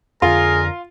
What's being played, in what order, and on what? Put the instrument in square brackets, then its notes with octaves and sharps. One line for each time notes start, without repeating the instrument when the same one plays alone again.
[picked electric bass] F2 D3 [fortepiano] F4 [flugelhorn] G#4 [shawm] A#4